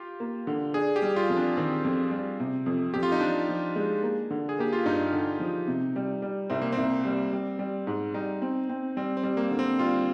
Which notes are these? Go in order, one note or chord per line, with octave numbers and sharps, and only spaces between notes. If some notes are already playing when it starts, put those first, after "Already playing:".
Already playing: F4 G4
A#3
D3
D4 G#4
G4
G3
F4
F2
D4
D#3 C4
F2
G3
C3
F2
F2 G4
F4
D#4
F3 D4
F3
G#3
A#3
D3
G#4
A#3 G4
F4
G2 D#4
D3
F3
C3
G3
G3
C2 C4
A#3
C4
C2
G3
G3
G3
G#2
G3 D#4
C4
C4
G3 C4
C4
G3
A#3
D3
C4
G3 F4